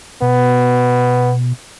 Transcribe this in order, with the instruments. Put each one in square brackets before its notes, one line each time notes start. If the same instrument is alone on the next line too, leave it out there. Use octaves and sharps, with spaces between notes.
[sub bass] B2 [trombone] B3